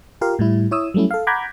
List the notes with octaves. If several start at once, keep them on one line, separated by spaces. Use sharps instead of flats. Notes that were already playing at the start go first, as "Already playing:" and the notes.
F4 G4 A#4 F5
A2 G3 E4
E4 C#5 D#6 E6
F#3 G3 A3 C#4 E4
A4 F5
F#5 A#5 B5 D6 G6 G#6